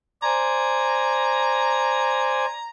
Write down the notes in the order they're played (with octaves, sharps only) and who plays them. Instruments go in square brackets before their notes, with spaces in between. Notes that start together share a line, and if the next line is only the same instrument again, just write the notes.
[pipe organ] C5 D5 G#5 [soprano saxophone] A#5